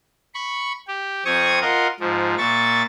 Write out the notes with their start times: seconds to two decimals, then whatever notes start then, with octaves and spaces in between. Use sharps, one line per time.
0.35 B5 C#6
0.88 G4
1.25 F2 C4 C#6 D#6 G#6
1.61 F4 A#4 D#5 F5 F#5
2.00 G#2 F3
2.38 A#2 E5 C#6 A6